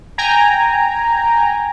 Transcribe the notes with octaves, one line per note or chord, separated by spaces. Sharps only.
G5 G#5 A#5